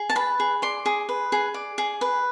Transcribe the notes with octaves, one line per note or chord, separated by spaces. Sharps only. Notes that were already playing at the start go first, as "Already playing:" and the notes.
Already playing: G#4
A5
B4 B5
G#4
D5 C6
G#4
B4
G#4
D5
G#4
B4